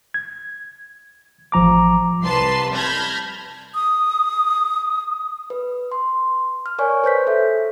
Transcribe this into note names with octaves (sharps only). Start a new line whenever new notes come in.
G#6
A1 F3 A#5 D6
C2 B4 A5 C6 C7
A5 B5 F6 G6 G#6 A#6
D#6
B4
C6
F6
A#4 C#5 D5 G#5 C#6
B4 C5 G6 B6
A4 E5